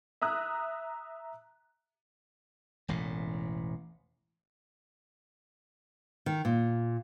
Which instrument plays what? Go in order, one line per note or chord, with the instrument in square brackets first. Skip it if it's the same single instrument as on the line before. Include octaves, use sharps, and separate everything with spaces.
[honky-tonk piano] E5 A#5 D#6 F#6
[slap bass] E1 A1 A2
[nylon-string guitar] D#3
A#2